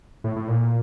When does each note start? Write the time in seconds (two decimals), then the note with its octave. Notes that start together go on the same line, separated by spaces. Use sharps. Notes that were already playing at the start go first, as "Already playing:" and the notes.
0.24 A2
0.36 A2
0.48 A#2